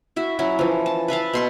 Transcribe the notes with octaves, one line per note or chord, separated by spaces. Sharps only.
E4 F#4 E5
F#3 C#4 E4 F#4
E3 F3
A5
B4 E5 F5 A5
B2 C6 C#6